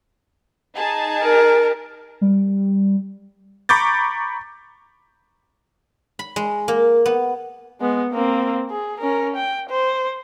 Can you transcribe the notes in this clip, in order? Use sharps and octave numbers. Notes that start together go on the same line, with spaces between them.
D#4 G#4 A5
A#4
G3
A#5 B5 C#6 D6 G6 A6
B5
G#3
A#3
B3
G#3 B3
A#3 C4
G#4
C#4 A#4
G5
C5